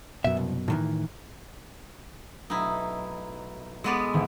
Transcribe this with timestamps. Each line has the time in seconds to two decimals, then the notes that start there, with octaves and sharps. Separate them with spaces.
0.24 F#2 B2 E5
0.37 C2
0.68 A2 D#3 E3
2.50 B1 A3 D#4 E4
3.84 G#3 B3 A4 D5
4.14 G#1 D3 E3